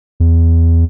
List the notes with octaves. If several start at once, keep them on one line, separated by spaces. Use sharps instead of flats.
E2